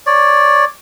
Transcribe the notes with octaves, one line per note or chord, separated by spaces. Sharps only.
C#5 D5